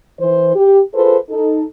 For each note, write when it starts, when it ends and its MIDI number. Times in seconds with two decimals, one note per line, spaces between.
0.20 0.51 52
0.20 0.51 72
0.55 0.81 67
0.94 1.17 65
0.94 1.17 68
0.94 1.17 69
0.94 1.17 71
0.94 1.17 72
1.30 1.63 63
1.30 1.63 69